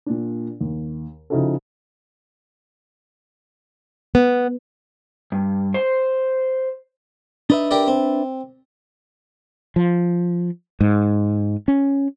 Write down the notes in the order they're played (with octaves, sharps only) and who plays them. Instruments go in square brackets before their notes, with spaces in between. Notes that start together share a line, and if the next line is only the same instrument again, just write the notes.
[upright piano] A#2 D4
D#2
C#3 F3 D#4 E4 F#4 A4
[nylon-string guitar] B3
[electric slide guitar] G2
C5
[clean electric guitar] D4 B4 E5 [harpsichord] D#4
[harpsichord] G4 A#4 D5
C4
[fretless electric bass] F3
G#2
C#4